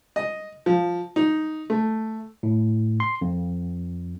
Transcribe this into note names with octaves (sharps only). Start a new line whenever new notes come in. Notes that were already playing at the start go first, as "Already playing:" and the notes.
D#5
F3
D#4
A3
A2
C6
F2